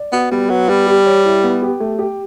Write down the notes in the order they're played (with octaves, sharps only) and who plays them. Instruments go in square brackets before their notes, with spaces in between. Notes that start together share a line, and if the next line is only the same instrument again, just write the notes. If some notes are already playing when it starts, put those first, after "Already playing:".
Already playing: [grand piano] D5
[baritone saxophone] B3 [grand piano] F#4
[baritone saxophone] G3 [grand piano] B3
[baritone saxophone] F#3 [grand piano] B4
[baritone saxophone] G3 [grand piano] B3
[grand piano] G4
C#5
E4
B3
G4
A3
G4